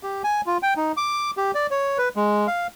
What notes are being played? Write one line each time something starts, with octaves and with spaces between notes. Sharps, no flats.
G4
G#5
F4
G5
D#4
D6
G4
D5
C#5
B4
G#3
F5